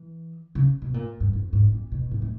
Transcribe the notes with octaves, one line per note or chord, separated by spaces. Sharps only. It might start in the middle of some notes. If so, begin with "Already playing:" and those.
Already playing: E3
C#3
B2
A#2
G2
F2
G#2
A#2
B2
A2
A2